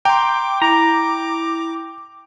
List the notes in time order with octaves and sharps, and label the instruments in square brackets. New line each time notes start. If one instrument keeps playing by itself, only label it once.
[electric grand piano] G5 [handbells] A#5 C6 [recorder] D6
[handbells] E4 [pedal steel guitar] A#5 [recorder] D6